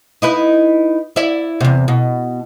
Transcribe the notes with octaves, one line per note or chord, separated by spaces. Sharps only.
D#4 E4 B4
E4 D5 E5
E2 C3
B2